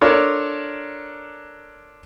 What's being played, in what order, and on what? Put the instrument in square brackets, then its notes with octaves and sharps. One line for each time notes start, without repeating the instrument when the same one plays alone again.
[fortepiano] D4 F4 A4 A#4 C#5 D5